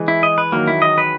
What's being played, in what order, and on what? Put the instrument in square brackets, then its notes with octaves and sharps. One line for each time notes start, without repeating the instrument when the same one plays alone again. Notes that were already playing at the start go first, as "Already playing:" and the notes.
Already playing: [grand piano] E3 G#3
[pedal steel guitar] E4
D#5
B4
[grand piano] D#3 F#3 [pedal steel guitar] A#3
[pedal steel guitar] E4
D#5
B4